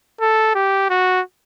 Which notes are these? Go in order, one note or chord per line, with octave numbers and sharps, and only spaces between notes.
A4
G4
F#4